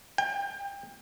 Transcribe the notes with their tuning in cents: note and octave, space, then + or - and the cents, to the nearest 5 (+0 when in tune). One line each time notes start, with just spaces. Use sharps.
G5 +30